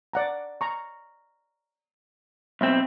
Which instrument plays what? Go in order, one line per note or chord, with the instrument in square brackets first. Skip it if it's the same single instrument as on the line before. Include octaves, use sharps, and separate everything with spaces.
[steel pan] D5 F#5 A#5
A#5 C#6
[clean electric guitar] B1 C4 [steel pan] E5 E6